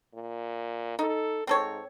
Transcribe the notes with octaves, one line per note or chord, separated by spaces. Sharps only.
A#2
D#4 A4
G#2 C4 A4 C#5